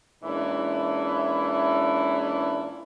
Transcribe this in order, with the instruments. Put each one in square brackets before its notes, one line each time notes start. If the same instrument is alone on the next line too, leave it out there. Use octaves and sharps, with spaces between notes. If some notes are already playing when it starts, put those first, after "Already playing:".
[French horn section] A#2 E3 G#3 C#4 D4 E4